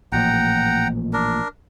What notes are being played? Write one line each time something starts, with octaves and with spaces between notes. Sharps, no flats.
A1 A#2 F3 F#5 G5 A#5
D4 A#4